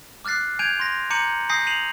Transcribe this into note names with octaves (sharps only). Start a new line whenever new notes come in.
D6 F6 F#6 A6 C7
G#5 G6 G#6 D7 D#7 F7
C6 A#6
A#5 D6 G6 C#7 D#7 F#7
G#5 D#6 G6 A#6 C7
C7 D#7 F7 F#7